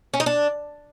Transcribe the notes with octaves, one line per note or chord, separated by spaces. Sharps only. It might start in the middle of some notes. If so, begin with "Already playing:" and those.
C#4
D#4
D4